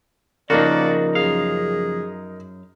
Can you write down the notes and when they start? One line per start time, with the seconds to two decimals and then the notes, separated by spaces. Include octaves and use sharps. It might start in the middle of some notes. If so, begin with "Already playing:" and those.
0.50 C#3 F3 A#3 D4 D#4 F#4 A#4 D5
1.15 F#2 G#4 F5